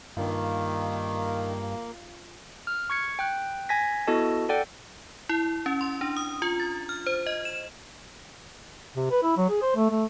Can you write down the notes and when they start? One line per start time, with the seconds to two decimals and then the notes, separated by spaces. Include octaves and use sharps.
0.17 G2 D#3 A#3 F4
2.67 F6
2.90 C#6 G#6 C#7
3.19 G5 F#6
3.69 G#5 G#6 A#6 B6
4.07 B3 E4 F#4 A4 D#5 A5
4.49 A4 D5 F#5 G5
5.29 E4
5.66 C#4
5.81 C6
6.01 D4
6.17 D#6
6.42 F4
6.60 A6
6.89 F6
7.07 C5
7.27 D#5
7.45 E7
8.96 C3
9.11 B4
9.23 E4
9.37 F#3
9.49 G#4
9.62 C5
9.76 A3
9.90 A3